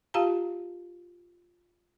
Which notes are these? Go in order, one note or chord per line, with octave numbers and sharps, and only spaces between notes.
F4 G4 F5 A5 A#5